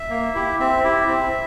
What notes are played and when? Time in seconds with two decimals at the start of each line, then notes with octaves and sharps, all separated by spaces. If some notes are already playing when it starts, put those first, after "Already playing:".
Already playing: E5
0.10 A#3
0.35 E4 G4
0.60 C4 E5
0.84 E4 G4
1.08 C4